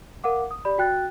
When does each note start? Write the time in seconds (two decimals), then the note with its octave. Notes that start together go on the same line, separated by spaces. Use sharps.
0.24 A#4 F5 F#5 D6
0.51 D#6
0.65 G4 D5 B5
0.78 F#4 G5 F#6 A6